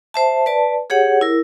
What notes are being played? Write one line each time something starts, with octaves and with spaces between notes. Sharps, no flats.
C5 E5 A5
B4 D5 A5
G4 G#4 C#5 F#5
E4 A#4